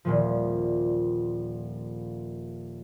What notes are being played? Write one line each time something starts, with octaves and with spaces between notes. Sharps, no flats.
D#1 A#2 F3